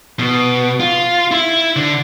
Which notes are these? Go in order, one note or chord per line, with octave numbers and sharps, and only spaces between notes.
B2
F4
E4
D3